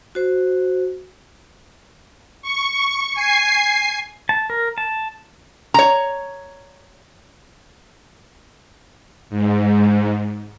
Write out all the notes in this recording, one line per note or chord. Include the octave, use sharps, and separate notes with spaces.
F#4 C5
C#6
G#5 C7
A5
A#4
A5
C#5 A#5
G#2